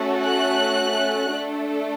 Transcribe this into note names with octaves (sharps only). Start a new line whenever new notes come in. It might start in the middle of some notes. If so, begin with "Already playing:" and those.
Already playing: A3 C#4 F#4 A4
F#6
A3 D4 A4